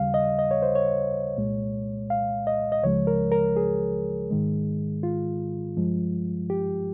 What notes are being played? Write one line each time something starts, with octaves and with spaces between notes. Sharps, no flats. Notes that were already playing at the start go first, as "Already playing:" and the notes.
Already playing: D#2 C#3 G3 F5
D#5
D#5
C#5
C5
C#5
C2 A#2 G#3
F5
D#5
D#5
C#2 C#3 F3 G#3 C#5
A#4
A#4
G#4
G#2 D#3 G#3
F4
G2 F3 G#3
G4